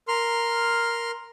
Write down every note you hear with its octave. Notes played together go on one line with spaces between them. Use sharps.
A#4 C6 F6